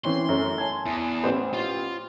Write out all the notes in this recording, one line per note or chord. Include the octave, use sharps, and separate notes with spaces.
E3 C4 C#4 C6
F#2 A3 C#4
G#5 A5 G#6
E2
A1 B4 C5
F4